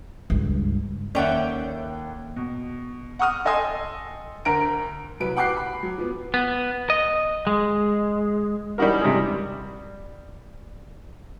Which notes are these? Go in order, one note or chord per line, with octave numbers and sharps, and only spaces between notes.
C#2 G2
D#2 C#4 A4 C#5 D5 E5 F#5 G5
B2
F#5 C#6 D#6 F6
A4 D#5 G5 G#5 C6 D#6
D2 A#4 A#5 D7
C2 F#3 B4 D7
F#5 G5 D6 F#6 C7
B5
F#3
F3 B3
B3
D#5
G#3
G3 C#4 D#4 E4 F#4 A#4
C3 G#3
G3